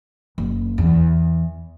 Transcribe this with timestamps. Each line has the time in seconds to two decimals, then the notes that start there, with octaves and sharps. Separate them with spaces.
0.38 F#1
0.78 E2